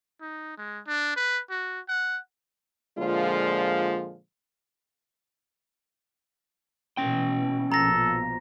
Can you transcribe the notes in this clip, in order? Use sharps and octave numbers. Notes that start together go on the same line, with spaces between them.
D#4
G#3
D4
B4
F#4
F#5
A#2 D3 F3 G#3 F4
B2 E3 C#4 G5
A#1 B2 F3 A4 A#5 A#6